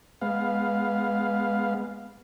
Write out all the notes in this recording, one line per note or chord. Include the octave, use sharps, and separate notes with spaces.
G#3 B3 F5